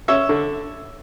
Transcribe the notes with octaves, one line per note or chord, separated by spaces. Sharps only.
C#4 E5
D3